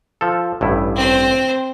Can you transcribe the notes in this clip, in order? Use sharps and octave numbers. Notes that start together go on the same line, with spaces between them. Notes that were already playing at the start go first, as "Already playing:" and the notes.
F3 A4
A1 G2 E4
C4 C5